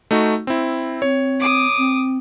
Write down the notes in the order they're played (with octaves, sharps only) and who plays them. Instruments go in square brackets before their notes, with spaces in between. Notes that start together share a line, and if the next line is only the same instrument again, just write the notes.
[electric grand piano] A3 D#4 F#4
C4 E4
[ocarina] C4 [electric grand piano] C#5
[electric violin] D6 D#6
[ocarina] C4